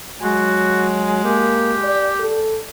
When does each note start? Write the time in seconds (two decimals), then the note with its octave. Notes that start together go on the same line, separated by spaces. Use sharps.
0.22 F#3 G#3 F#4
1.24 A#3 G4
1.84 D5
2.20 A4